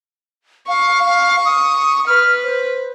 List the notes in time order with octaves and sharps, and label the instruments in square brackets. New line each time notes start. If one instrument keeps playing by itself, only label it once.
[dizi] F5 [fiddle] C#6
[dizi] F5
D#6
[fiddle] B4 [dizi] F6
[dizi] C5